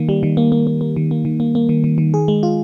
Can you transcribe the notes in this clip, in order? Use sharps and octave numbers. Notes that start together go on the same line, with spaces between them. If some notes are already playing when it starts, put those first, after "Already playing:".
Already playing: D#3 A#3
G3
D#3
A#3
A#3
A#3
A#3
D#3
A#3
D#3
A#3
A#3
D#3
D#3
D#3
G#4
G#3
F4